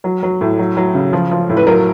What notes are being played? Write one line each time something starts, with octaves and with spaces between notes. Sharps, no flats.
F#3
F#3
A2
F#3
F#3
C#3
F3
F3
A2
B4
F#3 A#4